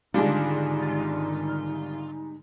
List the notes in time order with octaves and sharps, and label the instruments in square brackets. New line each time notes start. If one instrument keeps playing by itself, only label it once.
[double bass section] G#1 D3 D#3 [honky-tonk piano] G3 G#3 [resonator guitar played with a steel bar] D4 F4 [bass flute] D#4